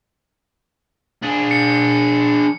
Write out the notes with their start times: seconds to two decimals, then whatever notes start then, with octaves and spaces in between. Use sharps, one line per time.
1.22 D4 G#4
1.51 C#7